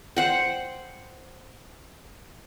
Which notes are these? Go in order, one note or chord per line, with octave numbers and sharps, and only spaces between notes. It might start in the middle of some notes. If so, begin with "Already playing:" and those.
C5 F#5 G5